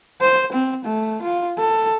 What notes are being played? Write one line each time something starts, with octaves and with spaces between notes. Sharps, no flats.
C5
C4
A3
F4
A4